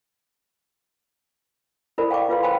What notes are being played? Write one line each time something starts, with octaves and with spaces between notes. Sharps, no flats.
E4 A4 A#4 C5 D5 B5
F5 G5 C#6 D6
F4 B4 F5 C6
C5 F5 G5 B5